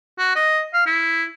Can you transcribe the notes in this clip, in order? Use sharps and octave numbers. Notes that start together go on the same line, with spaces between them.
F#4
D#5
F5
E4